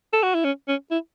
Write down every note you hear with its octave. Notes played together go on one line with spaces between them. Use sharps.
A4
F#4
E4
C#4
C#4
E4